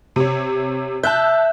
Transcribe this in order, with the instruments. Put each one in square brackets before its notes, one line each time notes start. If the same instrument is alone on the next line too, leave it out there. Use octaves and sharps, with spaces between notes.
[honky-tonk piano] C3 C#5
[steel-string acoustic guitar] E5 [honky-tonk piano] A5 F#6 G6